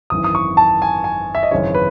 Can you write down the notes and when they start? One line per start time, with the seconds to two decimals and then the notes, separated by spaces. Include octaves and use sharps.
0.10 G#1 F#2 E3 D#6
0.24 D#6
0.35 C#6
0.57 A5
0.82 G#5
1.04 G#5
1.35 E5
1.43 D#5
1.51 G#1 F#2 C#3 E3 C#5
1.75 B4